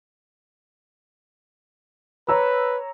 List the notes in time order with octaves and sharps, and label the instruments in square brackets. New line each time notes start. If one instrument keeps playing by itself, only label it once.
[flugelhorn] B4 [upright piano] C#5 A#5 E6